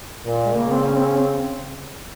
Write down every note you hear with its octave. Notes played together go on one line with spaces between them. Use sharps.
A#2
G#3
C#3 A#3
C4
C#4
C4
C#4
C4